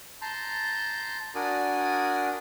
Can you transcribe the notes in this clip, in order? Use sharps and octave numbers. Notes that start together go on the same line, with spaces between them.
A5 A#5 C6 G6
D4 F#4 A#4 D5 G#5 D#6